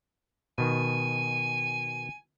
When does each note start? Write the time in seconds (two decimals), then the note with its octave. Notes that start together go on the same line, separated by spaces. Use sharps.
0.58 B2 D#3 G#5